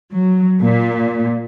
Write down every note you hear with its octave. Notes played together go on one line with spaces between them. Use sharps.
F#3
A#2